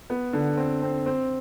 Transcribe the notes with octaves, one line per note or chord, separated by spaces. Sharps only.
B3
D3
C4
C4
C4